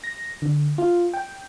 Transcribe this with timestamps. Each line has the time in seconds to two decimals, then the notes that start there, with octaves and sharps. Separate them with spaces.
0.04 A#6
0.42 D3
0.78 F4
1.14 G5